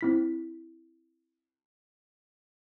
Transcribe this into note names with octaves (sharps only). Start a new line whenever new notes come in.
C4 E4 B6